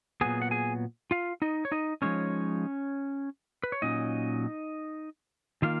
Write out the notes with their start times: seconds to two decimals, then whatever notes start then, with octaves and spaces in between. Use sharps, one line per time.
0.21 A#2 F#3 B3 G#4 G#5
0.42 F#5
0.51 G#4 G#5
1.11 F4 F5
1.42 D#4 D#5
1.65 C#5
1.72 D#4 D#5
2.02 F3 G#3 C#4 D#4 C#5
3.63 B4
3.72 C#5
3.82 A#2 F#3 C#4 D#4 D#5
5.62 D#3 A#3 F4 F5